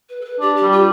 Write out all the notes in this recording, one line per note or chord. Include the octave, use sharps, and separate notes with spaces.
B4
A4
B4
D4 G4
G4
G3
F4